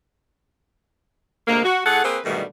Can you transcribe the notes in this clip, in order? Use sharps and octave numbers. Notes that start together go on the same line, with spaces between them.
D2 C3 G#3 A#3
F#4
A2 G#4 A4 F#5
A#3 C4 G#4 B4
G#2 B2 D3 D#3 G3 A3